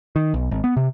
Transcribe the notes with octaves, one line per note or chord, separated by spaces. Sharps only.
D#3
B1
G#1
B3
C3